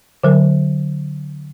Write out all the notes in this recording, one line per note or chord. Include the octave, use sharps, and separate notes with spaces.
D3 F#3 A#4